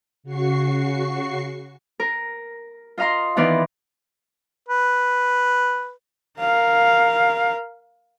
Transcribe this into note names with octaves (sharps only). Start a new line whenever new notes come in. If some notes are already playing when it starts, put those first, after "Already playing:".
C#3 F#4 C#6 C7
A#4
F4 D#5 F5 A#5 C6
D#3 E3 B3 D5 F5 C6
B4
A#4 F5